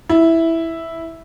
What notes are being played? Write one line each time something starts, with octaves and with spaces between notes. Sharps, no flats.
E4